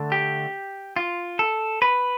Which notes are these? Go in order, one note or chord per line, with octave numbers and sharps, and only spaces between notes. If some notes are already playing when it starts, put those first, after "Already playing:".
Already playing: D3 A3 D4
G4
F4
A4
B4